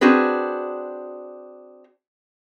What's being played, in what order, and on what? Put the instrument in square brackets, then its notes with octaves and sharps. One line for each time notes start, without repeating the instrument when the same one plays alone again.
[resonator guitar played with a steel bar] C4 D4 F#4 G#4 B4